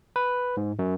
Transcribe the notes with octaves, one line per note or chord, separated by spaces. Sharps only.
B4
G#2
F#2